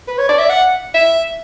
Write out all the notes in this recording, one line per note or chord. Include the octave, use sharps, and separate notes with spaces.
B4
C#5
D5
E5
F#5
E5